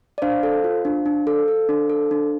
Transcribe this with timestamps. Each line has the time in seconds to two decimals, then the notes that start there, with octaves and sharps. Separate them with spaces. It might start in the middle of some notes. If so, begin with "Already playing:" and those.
0.18 D5
0.22 D4 C5 F5
0.43 A4
0.64 F4
0.85 D4
1.06 D4
1.27 A4
1.48 A4
1.69 D4
1.90 A4
2.11 D4